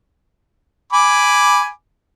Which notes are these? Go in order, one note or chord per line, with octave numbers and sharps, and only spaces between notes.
G#5 B5 D6